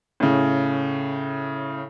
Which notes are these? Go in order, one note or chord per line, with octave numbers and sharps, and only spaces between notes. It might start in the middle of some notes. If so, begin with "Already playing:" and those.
A2 C#3